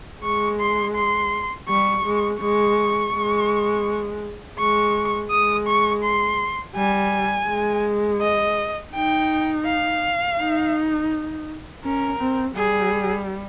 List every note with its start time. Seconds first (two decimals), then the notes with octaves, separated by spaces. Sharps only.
0.23 G#3 C#6
0.60 C6
0.95 C6
1.68 G3 C#6
2.05 G#3
2.40 G#3 C#6
3.14 G#3
4.58 G#3 C#6
5.31 G#3 D#6
5.67 C#6
6.03 C6
6.76 G3 G#5
7.48 G#3
8.21 D#5
8.93 D#4 G5
9.66 F5
10.39 D#4
11.83 C#4 A#4
12.19 C4
12.56 G3 G#4